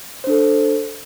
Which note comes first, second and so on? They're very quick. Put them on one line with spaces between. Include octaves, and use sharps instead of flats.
C5 D4 A4